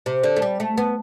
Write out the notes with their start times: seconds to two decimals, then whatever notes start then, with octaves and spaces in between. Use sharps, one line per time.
0.06 C3
0.23 D3
0.37 A3
0.42 G3
0.60 A3
0.78 B3